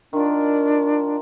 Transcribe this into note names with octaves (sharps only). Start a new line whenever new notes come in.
D#3 D4 F4